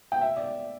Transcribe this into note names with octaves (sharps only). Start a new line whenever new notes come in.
G5
E5
D5